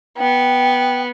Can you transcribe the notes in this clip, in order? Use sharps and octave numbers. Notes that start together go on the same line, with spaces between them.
B3 G5